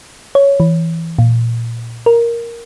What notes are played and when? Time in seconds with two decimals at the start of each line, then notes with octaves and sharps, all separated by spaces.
0.35 C#5
0.60 E3
1.19 A#2
2.06 A#4